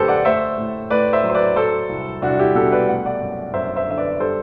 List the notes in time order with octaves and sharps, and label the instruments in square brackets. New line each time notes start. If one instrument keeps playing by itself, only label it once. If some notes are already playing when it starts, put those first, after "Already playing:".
Already playing: [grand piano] F#2 D3 A3 G4 A4 B4 C5
D5 F#5
A3 C5 E5
A2
A2 B4 D5
C5 E5
F#3
C5
B4 D5
F#3 A4 C5
C2
C2 D4 F#4
E4 G4
B2 F#4 A4
B4 D5
A3 F#5
D5 F#5
F#2
F#2 C5 E5
C5 E5
D3 E5
B4 D5
G3 A4 C5